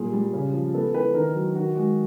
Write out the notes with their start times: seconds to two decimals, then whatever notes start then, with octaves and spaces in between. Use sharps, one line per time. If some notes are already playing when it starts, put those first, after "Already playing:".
Already playing: A#2 G3 G#4
0.12 G3
0.33 C#3
0.53 F3
0.74 B3 A4
0.94 E3 B4
1.14 D#3 A#4
1.35 F#3
1.55 D#3 F#4
1.75 G#3 F#4